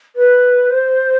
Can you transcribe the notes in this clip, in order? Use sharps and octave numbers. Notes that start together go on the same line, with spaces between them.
B4
C5